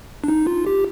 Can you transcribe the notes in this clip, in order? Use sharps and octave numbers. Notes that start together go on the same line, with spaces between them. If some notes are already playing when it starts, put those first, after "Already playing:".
D4
D#4
F4
G4